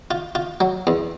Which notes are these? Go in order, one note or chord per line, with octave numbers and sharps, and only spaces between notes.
F4
F4
F#3
E2